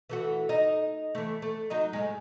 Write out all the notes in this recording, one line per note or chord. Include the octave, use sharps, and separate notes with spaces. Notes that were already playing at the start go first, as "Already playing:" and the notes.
E3 A3 F#4
D#4 D#5
E3 A3
A3
F#3 D#4 D#5
A2 G#3